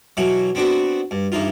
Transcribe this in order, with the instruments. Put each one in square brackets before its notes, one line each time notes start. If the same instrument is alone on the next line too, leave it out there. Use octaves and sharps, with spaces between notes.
[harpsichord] B2 E3 F#3 D6
B3 C4 D4 F#4
G2
G2 E3 D#4 F4